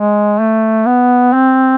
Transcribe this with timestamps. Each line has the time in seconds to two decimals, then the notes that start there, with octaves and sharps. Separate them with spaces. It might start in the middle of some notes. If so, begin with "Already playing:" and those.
Already playing: G#3
0.40 A3
0.86 B3
1.33 C4